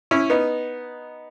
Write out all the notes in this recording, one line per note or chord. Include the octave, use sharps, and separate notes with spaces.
C#4 E4
B3 D#4